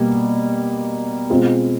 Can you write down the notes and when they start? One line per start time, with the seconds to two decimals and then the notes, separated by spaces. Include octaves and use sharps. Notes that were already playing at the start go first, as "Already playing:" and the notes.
Already playing: B2 G3 A#3
1.30 B2 G#3 C4 F4 G#4